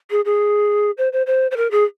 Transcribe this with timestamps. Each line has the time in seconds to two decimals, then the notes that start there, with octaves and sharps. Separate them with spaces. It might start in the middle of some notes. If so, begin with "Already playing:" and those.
0.11 G#4
0.25 G#4
0.98 C5
1.13 C5
1.27 C5
1.51 C5
1.57 A#4
1.71 G#4